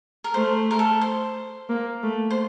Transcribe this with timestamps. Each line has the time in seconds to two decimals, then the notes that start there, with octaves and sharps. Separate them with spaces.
0.24 A#4
0.34 A3 C5
0.71 A#4
0.79 A4
1.01 C5
1.69 A#3
2.03 A3
2.30 C5